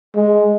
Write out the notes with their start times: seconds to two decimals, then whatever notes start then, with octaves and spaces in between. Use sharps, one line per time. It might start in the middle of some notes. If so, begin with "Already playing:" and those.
0.15 G#3